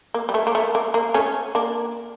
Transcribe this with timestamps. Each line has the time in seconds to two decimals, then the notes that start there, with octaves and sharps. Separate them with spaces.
0.14 A#3
0.29 G3
0.34 A3
0.47 A#3
0.55 A3
0.75 A#3
0.94 A#3
1.14 A3 C#4
1.55 A#3 D4